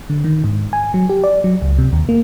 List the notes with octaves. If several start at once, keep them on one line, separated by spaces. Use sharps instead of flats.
D3
D#3
G#2
G#5
F#3
G4
D5
F#3
C#2
C3
D#2
A#3